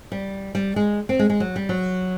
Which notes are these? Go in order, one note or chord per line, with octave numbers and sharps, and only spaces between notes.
G3
G3
G#3
C4
G#3
G#3
F#3
G3
F#3